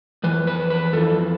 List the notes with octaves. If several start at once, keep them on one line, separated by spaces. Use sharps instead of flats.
F2 E3 B4
B4
B4
F2 E3 A4